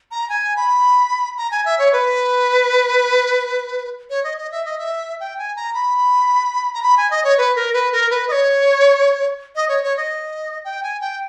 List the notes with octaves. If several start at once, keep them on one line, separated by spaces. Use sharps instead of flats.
A#5
G#5
B5
A#5
G#5
E5
C#5
B4
C#5
D#5
D#5
E5
D#5
E5
G5
G#5
A#5
B5
A#5
B5
G#5
D#5
C#5
B4
A#4
B4
A#4
B4
D#5
C#5
D#5
C#5
C#5
D#5
G5
G#5
G5